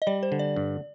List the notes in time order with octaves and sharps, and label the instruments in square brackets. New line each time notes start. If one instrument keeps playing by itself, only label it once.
[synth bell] D#5
[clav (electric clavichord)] G3 [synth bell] D5
[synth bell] C5
[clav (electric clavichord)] D3
[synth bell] D5
[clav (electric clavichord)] G2